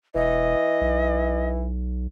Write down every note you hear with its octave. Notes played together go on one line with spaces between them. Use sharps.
E1 E3 D#5
B1